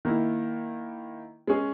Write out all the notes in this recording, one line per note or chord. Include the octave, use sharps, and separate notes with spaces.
D#3 A#3 E4
G#3 C#4 G#4